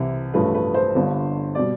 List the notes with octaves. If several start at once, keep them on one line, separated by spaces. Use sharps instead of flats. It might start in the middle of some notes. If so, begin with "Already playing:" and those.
Already playing: C2 C3 E3 E4
A1 G2 F3 A3 B4
B4
C5
G1 G2 D3
B2 G3 D5